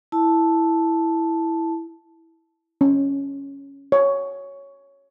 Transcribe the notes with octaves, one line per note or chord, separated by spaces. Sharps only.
E4 A5
C#4
C#5